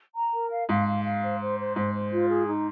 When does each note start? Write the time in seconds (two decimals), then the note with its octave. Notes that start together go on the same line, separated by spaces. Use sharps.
0.16 A#5
0.34 A#4
0.52 F5
0.69 G#2 F5
0.87 F5
1.05 F5
1.22 C5
1.40 C5
1.59 C5
1.76 G#2 C5
1.93 C5
2.12 F4
2.29 G#4
2.47 D#4